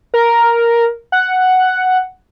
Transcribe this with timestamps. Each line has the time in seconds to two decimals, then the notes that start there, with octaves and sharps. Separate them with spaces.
0.14 A#4
1.12 F#5